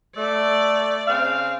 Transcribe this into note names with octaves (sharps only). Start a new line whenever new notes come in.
A3 D5
C#3 C4 F5